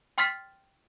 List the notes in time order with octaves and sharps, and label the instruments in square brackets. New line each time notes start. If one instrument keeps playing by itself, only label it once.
[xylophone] G5 C6 F6 A6 B6